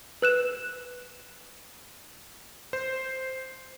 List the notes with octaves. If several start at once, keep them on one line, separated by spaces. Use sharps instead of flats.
B4 F#6 E7
C5